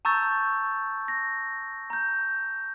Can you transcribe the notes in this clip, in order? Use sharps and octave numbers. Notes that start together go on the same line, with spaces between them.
A5 A#5 C#6 E6 G6 A6
A#6
A#5 G6